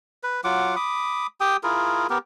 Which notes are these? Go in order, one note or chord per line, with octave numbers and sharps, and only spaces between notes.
B4
F#3 F4 F#5 D6
B5 D6 D#6
G4 G5 D#6
E4 F4 G#4 A#4
B3 G4 A#4